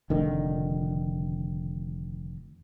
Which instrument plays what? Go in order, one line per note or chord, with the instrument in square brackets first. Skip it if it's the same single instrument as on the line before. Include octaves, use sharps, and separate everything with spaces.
[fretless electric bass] F1 D3 D#3